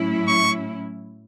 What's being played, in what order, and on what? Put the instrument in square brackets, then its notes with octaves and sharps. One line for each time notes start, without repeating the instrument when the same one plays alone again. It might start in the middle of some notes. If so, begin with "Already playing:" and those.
Already playing: [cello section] A2 F#3 C#4 E4
[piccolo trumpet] C#6